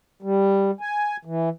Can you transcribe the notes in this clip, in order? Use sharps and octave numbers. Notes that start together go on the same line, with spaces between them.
G3
G#5
E3